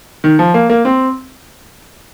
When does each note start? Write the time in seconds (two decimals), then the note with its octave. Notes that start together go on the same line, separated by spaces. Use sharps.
0.24 D#3
0.39 F3
0.54 A#3
0.70 A#3
0.85 C4